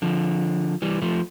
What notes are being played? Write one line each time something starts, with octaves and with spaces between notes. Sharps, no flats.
D3 F3
E3 G3
F3 A3